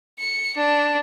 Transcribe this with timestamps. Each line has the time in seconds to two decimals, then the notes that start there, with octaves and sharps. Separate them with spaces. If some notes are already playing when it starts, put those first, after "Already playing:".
0.19 C#7
0.56 D4